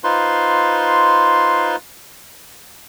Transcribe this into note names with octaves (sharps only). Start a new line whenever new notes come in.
D#4 F4 B4 C5 C6